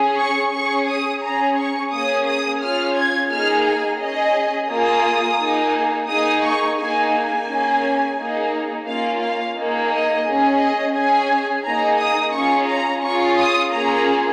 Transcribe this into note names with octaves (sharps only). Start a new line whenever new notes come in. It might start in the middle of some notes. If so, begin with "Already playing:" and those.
Already playing: C#4 G#4
C#6
C#4 G#4 C#6
D#6
C#4 G#4 A#5
C#6
A#3 C#4 G#4 D#6
D#6
C#4 F4 G#4 F6
G#6
A#3 D#4 G#4 F6
G#5
C#4 G#4 D#5
A#3 F4 G#4 D#6
A#3 D#4 G#4
A#3 D#4 G#4 D#6
C#6
A#3 D#4 G#4 G#5
G#5
A#3 C#4 G#4
A#3 D#4 G#4
A#3 C#4 F4 F5
F5
A#3 D#4 G#4
D#5
C#4 G#4
D#5
C#4 G#4 G#5
A#3 D#4 G#4 A#5
D#6
C#4 F4 G#4 C#6
A#5
C#4 F4 G#4 C#6
D#6
A#3 C#4 F4 G#4 A#5